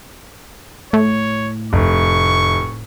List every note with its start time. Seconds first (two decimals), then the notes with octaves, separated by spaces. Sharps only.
0.93 A2 C#5
1.73 F1 C#6